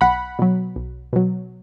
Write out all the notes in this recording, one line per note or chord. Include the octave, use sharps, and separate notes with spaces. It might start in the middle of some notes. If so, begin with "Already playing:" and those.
B1 F#5 B5
B2 F#3
B1
B2 F#3